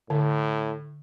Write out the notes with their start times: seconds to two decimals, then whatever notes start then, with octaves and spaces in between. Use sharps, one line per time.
0.10 A2 D3